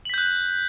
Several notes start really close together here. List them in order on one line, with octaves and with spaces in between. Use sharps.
F#7 B6 G6 F#6